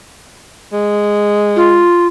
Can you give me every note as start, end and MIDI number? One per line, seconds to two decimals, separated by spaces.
0.73 1.86 56
1.56 2.07 65